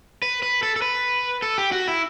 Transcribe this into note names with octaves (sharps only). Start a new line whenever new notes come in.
B4
B4
A4
A4
B4
A4
G4
F#4
E4